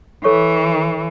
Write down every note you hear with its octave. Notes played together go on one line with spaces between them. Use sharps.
E3 A4 C#5 C#6